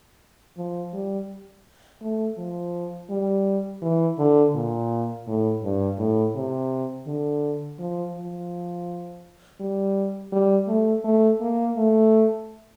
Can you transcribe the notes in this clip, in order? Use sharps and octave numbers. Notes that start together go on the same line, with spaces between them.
F3
G3
A3
F3
G3
E3
D3
A#2
A2
G2
A2
C3
D3
F3
F3
G3
G3
A3
A3
A#3
A3